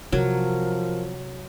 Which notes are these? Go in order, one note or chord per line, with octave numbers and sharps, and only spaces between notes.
C3 F3 F#3 A#4